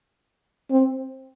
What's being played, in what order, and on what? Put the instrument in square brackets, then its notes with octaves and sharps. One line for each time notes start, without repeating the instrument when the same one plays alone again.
[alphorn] C4